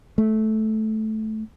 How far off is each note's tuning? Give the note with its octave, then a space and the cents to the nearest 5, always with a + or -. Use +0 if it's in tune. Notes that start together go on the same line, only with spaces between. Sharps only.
A3 -10